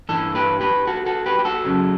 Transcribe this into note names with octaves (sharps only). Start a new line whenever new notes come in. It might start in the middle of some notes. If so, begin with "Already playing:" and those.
G2 E3 A4
G4 B4
G4 B4
F#4 A4
F#4 A4
G4 B4
G4
F#4 A4
F#2 C#3 F#3